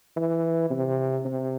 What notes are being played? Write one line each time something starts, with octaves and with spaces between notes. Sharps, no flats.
E3
C3
C3